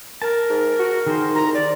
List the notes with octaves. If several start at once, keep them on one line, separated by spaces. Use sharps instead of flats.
A#4 A5
G#2
F#4
D#3 G#4 C5
C2 A#5
D5